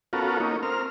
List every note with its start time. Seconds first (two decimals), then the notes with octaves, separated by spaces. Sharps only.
0.13 B3 C#4 F4 F#4 A4 A#4
0.40 A#3 C#4 D#4
0.63 C4 A#4 F6